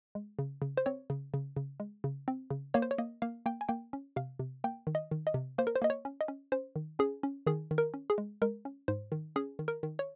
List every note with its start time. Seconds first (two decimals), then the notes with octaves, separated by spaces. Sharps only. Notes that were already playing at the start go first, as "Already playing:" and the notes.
0.15 G#3
0.39 C#3
0.62 C#3
0.77 C5
0.86 C4 C#5
1.10 C#3
1.34 C#3
1.57 C#3
1.80 G#3
2.04 C#3
2.28 C4
2.50 C#3
2.74 A#3 C#5
2.82 C5
2.91 C#5
2.98 A#3 D#5
3.22 A#3 F5
3.46 A#3 G5
3.61 G#5
3.69 A#3 G5
3.93 C#4
4.16 C3 F5
4.39 C3
4.64 A#3 G5
4.87 D#3
4.95 D#5
5.11 D#3
5.27 D#5
5.34 C3
5.58 A#3 C5
5.67 A#4
5.76 C5
5.82 A#3 D#5
5.90 C#5
6.05 C#4
6.21 D#5
6.28 C#4
6.52 C#4 C5
6.76 D#3
6.99 C#4 G#4
7.23 C#4
7.47 D#3 G#4
7.71 D#3
7.78 A#4
7.94 C#4
8.10 G#4
8.18 G#3
8.42 G#3 A#4
8.65 C#4
8.88 G#2 C5
9.12 D#3
9.36 C#4 G#4
9.59 D#3
9.68 A#4
9.83 D#3
9.99 C#5